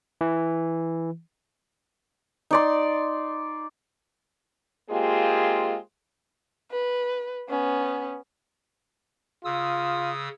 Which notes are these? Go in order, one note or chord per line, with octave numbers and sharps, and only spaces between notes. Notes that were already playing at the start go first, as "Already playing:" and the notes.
E3
D#4 D5 C6
G#3 A#3 C4 F4 G4 G#4
B4
B3 C#4
C#3 F4 D#6 E6